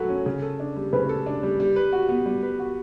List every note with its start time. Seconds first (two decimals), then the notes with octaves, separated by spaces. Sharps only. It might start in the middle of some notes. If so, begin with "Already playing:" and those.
Already playing: F#3 F#4 A4 B4
0.09 C#4
0.26 C#3
0.42 A4
0.60 D4
0.76 G3
0.93 C#3 B4
1.09 A4
1.26 D4
1.43 G3
1.60 G3
1.76 B4
1.92 F#4
2.09 B3
2.26 G3
2.43 B4
2.59 F#4